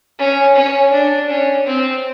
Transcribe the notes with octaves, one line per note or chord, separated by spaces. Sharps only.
C#4
C#4
D4
C#4
C4